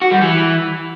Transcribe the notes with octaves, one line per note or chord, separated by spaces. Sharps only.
F#4
G3
E3